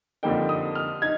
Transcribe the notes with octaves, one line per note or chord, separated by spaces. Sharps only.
F2 D3 G3 A#3 D#4 G5
D#6
F6
D#4 G#6